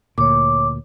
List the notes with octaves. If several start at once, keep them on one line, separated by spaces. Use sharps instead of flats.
D2 A#2 C#5 D6